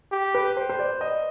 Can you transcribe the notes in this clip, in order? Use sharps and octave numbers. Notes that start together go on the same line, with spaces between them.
G4
B4
C5
C5
D5
D#5